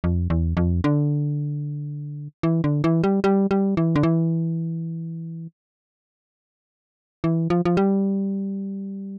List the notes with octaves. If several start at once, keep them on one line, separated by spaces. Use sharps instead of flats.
F2
E2
F2
D3
E3
D3
E3
G3
G3
G3
E3
D3
E3
E3
F3
F3
G3